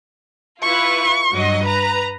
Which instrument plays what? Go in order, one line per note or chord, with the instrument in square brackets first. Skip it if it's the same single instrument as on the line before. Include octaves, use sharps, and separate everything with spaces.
[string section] E4 F4 B4 [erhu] C#6
[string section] G2 F#3 D#5
B4 A#5